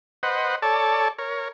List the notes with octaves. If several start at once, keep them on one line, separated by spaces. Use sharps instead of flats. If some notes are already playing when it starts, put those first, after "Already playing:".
B4 C5 D#5 F#5
A4 C#5 D5 A5
A#4 C#5